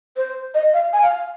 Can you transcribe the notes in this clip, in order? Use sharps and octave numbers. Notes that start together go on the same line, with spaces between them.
C5
D#5
F5
G#5
F5